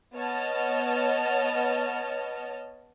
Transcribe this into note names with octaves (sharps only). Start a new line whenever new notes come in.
B3 C#5 D#5 A5 F6